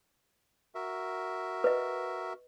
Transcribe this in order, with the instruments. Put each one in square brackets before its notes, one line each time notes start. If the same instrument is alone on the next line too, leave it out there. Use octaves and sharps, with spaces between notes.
[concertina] F#4 A#4 E5
[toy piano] B4 D#5